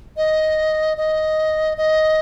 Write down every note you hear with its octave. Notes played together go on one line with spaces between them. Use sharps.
D#5
D#5
D#5